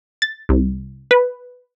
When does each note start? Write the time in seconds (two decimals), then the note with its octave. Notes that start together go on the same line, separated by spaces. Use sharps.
0.22 A6
0.49 C2
1.11 B4